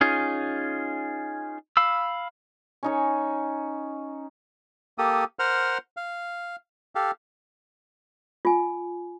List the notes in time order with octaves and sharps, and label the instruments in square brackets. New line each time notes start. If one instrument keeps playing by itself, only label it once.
[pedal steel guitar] C#4 D#4 F4 G#4
F5 B5 E6
[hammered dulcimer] C#4 D#4 C#5
[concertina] A#3 G4 A4 D#6
A#4 C5 F#5 F6
F5
G4 A4 F5
[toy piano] F4 G#5